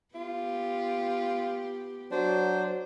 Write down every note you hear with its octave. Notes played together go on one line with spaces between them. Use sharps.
B3 F4 G4
F#3 D4 C5